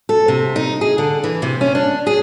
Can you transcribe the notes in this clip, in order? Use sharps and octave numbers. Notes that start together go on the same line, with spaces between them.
A4
C3
D#4
G#4
D3
E3
C3
C#4
D4
G#4